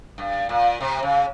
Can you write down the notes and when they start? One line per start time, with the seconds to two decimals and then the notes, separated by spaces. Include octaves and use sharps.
0.18 G2
0.49 A#2
0.80 C3
1.03 C#3